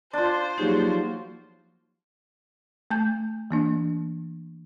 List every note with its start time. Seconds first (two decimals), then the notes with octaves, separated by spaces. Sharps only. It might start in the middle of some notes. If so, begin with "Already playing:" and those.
0.13 D4 F4 C5
0.58 F3 F#3 A#3 D#4 G4 G#4
2.91 A3 A5 G6
3.51 E3 A#3 D4